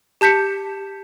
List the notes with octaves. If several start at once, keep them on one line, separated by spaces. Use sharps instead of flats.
G4 A5 G6 B6 C#7